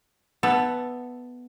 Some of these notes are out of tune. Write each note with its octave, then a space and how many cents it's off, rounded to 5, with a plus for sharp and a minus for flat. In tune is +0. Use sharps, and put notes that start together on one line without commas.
B3 +0 A4 +0 E5 +0